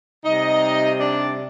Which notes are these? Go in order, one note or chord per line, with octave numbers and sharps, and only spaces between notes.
C3 G3 D#4 D#5
D4 D5